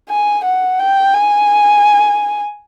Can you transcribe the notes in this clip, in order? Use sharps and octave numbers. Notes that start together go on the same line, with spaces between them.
G#5
F#5
G5
G#5